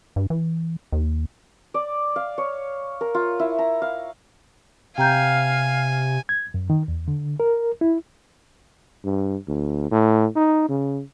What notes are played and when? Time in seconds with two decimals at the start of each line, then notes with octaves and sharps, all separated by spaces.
0.16 G2
0.30 E3
0.92 D#2
1.74 D5
2.16 F5
2.38 C#5
3.01 A#4
3.14 F4
3.39 E4
3.59 A#5
3.82 F5
4.98 C3 F5 G5 G#5 A#5 G6
6.29 G#6
6.54 F#2
6.70 D#3
6.88 E2
7.08 D3
7.40 A#4
7.81 E4
9.05 G2
9.48 D2
9.91 A2
10.36 D#4
10.69 C#3